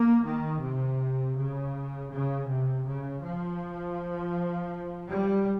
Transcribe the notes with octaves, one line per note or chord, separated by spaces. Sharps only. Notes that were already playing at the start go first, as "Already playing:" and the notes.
Already playing: A#3
D#3
C3
C#3
C#3
C3
C#3
F3
G3